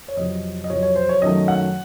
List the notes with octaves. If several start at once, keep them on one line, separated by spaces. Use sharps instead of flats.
C#5
F2 C3 F#3 D#5
D#5
F2 C3 F#3 C#5
C#5
C5
C#5
F#2 D#3 F#3 A3 D#5
F#5